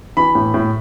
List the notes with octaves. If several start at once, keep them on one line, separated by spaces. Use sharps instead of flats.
E3 B5
A2
A2